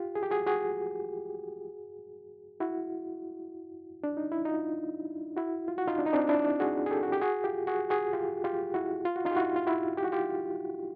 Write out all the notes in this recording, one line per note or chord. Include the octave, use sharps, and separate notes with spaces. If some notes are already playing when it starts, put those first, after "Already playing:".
Already playing: F4 G4
G#4
G4
F#4 G#4
F#4 G#4
E4 F#4
D4
D#4
E4
D#4 F4
E4 F#4
F4
F#4
D#4 F4
D4
D#4
C4 D4
D4 E4
F#4 G#4
G#4
G4 A4
F#4
G4
F#4 G#4
F4 G4
F#4 G#4
F#4 G#4
F4 G4
F4 G4
E4 F#4
F4
F#4
D#4 F4
G4
E4 F#4
F4
E4 F#4
G4
F#4
F4 G4